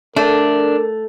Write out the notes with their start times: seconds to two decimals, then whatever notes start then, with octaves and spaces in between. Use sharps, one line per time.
0.16 A3 D4 A#4